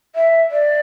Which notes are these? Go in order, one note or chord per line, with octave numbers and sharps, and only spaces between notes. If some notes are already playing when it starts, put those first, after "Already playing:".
E5
D5